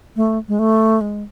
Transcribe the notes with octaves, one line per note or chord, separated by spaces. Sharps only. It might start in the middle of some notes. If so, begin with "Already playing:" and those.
A3
G#3
A3
G#3